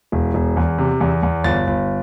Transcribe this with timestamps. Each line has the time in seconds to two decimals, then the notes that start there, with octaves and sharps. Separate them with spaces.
0.12 E1
0.34 E1
0.57 E2
0.78 C3
1.01 E2
1.23 E2
1.44 G1 A6
1.67 G1